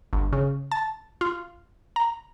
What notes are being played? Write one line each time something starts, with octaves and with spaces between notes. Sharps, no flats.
G1
C#3
A5
F4
A#5